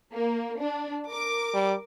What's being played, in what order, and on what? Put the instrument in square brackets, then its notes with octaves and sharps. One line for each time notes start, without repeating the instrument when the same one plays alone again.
[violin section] A#3
D4
A#4 D6
[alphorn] G3